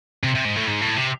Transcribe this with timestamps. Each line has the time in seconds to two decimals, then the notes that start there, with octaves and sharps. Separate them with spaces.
0.24 C3
0.35 C3
0.45 G#2
0.56 A2
0.67 G#2
0.81 A2
0.96 C3